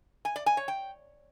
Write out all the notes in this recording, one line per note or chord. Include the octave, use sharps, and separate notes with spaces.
G#5
D5
G#5
C#5
G5